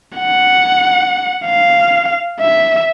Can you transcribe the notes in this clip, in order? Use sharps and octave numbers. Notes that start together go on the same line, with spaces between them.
F#5
F5
E5